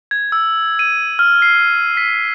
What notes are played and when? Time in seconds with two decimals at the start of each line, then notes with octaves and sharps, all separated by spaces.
0.11 G#6
0.32 E6
0.79 D#7
1.19 F6
1.42 C7
1.97 B6